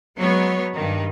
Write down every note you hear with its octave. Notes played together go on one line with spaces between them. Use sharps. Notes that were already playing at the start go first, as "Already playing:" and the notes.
F#3 G#3 B3 C#5
G2 D#3